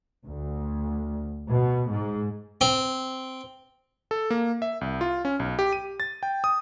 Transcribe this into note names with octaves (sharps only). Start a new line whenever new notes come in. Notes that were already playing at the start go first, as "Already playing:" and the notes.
D2
B2
G#2
C4
A4
A#3
E5
C2
F4
C#4
B1
G4
D#7
A6
G5
D#6